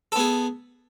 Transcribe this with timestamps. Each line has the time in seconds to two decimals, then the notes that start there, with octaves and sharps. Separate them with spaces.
0.12 A4
0.16 B3
0.19 G#4